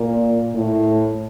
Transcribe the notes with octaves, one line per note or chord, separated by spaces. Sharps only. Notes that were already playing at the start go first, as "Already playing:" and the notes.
Already playing: A#2
A2